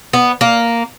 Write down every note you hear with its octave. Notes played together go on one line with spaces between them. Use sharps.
B3
A#3